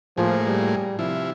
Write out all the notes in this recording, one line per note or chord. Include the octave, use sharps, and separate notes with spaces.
A2 F3 A#3 G#4
G3
C3 F3 E4